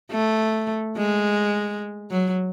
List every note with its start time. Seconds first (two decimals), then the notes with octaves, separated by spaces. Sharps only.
0.11 A3
0.97 G#3
2.11 F#3